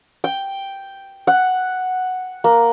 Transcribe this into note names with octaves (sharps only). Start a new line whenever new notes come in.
G5
F#5
A#3